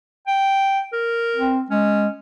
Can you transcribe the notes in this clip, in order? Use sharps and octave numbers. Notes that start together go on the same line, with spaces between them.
G5
A#4
C4
G#3 C#4